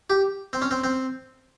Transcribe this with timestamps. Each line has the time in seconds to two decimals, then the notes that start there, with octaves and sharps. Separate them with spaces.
0.10 G4
0.53 C4
0.62 C#4
0.71 C4
0.84 C4